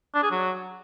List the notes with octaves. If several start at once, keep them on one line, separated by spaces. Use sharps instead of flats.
D4
G#4
F#3